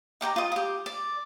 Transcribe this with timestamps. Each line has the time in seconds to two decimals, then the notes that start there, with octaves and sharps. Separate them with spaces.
0.21 D#4 G4 G5 A#5
0.36 F4 D#5
0.52 G4 D#6
0.86 D5